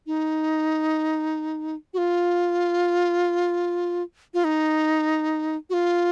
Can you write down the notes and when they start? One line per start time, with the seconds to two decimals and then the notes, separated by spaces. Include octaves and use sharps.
0.07 D#4
1.94 F#4
1.98 F4
4.34 F4
4.44 D#4
5.70 F#4
5.73 F4